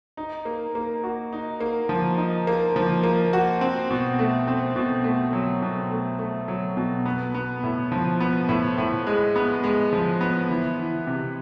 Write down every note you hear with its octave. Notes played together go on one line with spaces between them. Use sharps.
D#4
A#3
A#3
F#4
D#4
A#3
F3
D#4
A#3
F3
A#3
F#4
C4
B2
A3
C4
B2
A3
F#3
B2
A3
A3
F#3
B2
B3
B3
A2
F3
B3
A2
A2
G#3
B3
G#3
F3
B3
E3
E3
C3